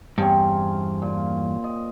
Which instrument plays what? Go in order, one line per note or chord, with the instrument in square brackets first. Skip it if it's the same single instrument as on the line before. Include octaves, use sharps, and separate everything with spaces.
[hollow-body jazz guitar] E2 G2 [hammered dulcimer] C4 C#4
[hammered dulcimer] A#2
D#5